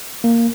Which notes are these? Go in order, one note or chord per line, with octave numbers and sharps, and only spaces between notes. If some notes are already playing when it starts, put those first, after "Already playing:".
A#3